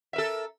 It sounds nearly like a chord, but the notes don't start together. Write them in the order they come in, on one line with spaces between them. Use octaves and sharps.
E5 A#4 A4